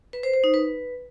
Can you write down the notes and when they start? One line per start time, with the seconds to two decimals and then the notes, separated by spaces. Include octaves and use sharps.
0.13 B4
0.23 C5
0.34 C5
0.44 D#4
0.54 B4